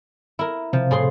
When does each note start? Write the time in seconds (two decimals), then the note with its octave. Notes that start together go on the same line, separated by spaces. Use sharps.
0.39 E4 A#4
0.73 C3 F3
0.91 A2 G#4 C6